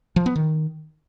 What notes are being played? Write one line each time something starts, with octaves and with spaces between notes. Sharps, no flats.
F3
B3
D#3